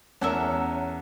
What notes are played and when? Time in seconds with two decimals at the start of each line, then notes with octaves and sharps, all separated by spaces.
0.21 E2 C#4 A4 A#4 E5 F#5